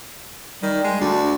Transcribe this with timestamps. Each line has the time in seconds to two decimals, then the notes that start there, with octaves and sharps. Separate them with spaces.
0.63 D#3 G3
0.84 G#3
1.01 D2 D4